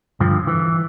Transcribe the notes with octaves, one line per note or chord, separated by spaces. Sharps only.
G2 D3 F3
E3